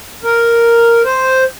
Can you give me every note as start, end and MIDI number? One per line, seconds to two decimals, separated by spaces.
0.24 1.02 70
1.05 1.44 72